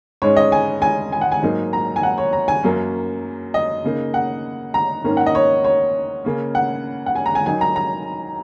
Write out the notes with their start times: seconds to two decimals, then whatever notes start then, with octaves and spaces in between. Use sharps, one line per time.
0.22 G#2 G#3 C#4 C#5
0.37 D#5
0.52 G#5
0.82 G#5
1.12 G#5
1.21 F#5
1.32 G#5
1.42 G#2 F#3 A#3 D#4
1.73 A#5
1.96 G#5
2.03 F#5
2.18 C#5
2.33 A#5
2.48 G#5
2.63 F#2 F#3 A#3 C#4
3.54 D#5
3.84 C#3 A#3 D#4
4.14 F#5
4.74 A#5
5.04 G#2 D#3 A#3 C#4
5.17 F#5
5.26 D#5
5.35 C#5
5.64 C#5
6.25 C#3 A#3 C#4
6.55 F#5
7.06 F#5
7.16 G#5
7.26 A#5
7.35 G#5
7.46 D#3 F#3 D#4 G#5
7.61 A#5
7.76 A#5